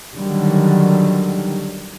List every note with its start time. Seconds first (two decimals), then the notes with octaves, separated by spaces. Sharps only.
0.14 D3 D#3 F#3 G3